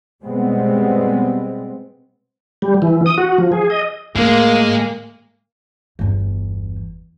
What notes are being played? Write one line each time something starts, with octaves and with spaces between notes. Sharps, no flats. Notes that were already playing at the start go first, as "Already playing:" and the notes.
B2 G3 G#3 B3 C4
G3
E3
D#6
F#4
F3
G#4
D#5
A2 G#3 A#3
G1 E2